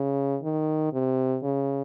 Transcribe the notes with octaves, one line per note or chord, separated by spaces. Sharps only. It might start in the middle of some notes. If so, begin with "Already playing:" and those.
Already playing: C#3
D#3
C3
C#3